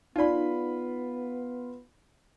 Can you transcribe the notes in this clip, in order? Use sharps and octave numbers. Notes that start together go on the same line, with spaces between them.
B3 D#4 F4 D5 B5